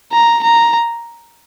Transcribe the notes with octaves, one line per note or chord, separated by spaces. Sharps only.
A#5
A#5